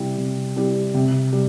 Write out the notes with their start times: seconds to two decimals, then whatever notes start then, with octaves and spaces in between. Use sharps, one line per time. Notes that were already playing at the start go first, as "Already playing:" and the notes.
Already playing: C3 G3 C4 E4 G4
0.17 C3
0.56 G3 C4 E4 G4
0.94 C3
1.33 G3